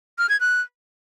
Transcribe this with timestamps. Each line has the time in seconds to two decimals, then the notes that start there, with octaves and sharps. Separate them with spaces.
0.18 F6
0.29 G#6
0.40 F#6